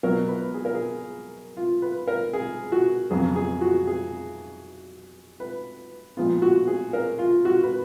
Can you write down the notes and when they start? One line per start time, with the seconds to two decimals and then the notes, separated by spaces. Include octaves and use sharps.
0.03 B2 F#3 B3 A#4
0.28 B4
0.54 G#4
0.65 A#4
0.75 G#4
1.57 F4
1.82 B4
2.07 A#4
2.33 G#4
2.72 F#4
3.10 F2 C#3 F#3 B3 G#4
3.36 G#4
3.61 F#4
3.87 G#4
5.40 B4
6.17 A#2 F3 G#3 B3 F4
6.42 F#4
6.67 G#4
6.93 A#4
7.19 F4
7.45 F#4
7.63 B4